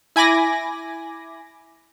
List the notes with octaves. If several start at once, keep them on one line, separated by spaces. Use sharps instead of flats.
E4 G#5 B5 D6 A#6